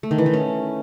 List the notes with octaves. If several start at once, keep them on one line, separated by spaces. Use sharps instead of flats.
A3
D#3
E3
D#3
C#4